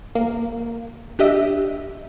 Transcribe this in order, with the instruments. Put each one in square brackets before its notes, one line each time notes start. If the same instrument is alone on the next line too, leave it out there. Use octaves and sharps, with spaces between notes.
[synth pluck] A#3
D4 G4 D#5 E5